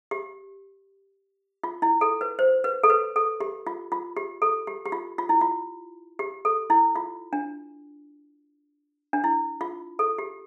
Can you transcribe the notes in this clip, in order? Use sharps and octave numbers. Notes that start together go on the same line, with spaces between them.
G4
F4
E4
A4
B4
C5
B4
A4
B4
A4
G4
F4
F4
G4
A4
G4
G4
F4
F4
E4
F4
G4
A4
E4
F4
D4
D4
E4
F4
A4
G4